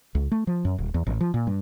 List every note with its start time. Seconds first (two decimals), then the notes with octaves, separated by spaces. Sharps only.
0.15 C#2
0.31 A3
0.47 F3
0.65 F#2
0.78 D#1
0.94 E2
1.06 A1
1.21 F3
1.34 A#2
1.47 G2